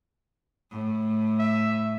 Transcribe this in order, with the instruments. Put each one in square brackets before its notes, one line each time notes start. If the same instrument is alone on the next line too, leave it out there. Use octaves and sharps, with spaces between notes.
[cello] A2
[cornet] E5